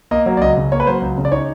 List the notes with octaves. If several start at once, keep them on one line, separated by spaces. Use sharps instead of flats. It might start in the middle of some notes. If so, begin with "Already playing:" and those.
A#3 D#5
F#3
D5
C#2 D#5
C#3
A#3 C#5
B4
F#3 C5
C#2
C#3
D5
D#4 C#5